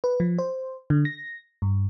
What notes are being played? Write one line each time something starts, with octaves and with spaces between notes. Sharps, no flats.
B4
F3
C5
D3
A#6
G2